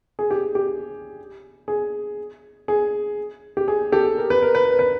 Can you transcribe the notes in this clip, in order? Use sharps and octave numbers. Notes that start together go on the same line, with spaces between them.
G#4
G4
G4
G#4
G#4
G4
G#4
G4 A4
A#4
B4
A#4
B4
A#4
B4